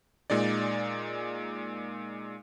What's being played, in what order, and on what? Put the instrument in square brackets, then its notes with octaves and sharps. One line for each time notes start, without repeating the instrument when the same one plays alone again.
[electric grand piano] A#2 G#3 D#4 D5